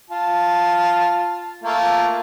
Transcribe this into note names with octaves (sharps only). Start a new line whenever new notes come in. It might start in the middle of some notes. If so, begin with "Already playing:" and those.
F4 A5
A3 A#3 F4